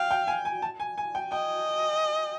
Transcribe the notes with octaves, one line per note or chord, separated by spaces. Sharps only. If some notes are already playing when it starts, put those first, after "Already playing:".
Already playing: F5 G5
G5
G#5
G#5
A5
G#5
G#5
G5
D#5 G5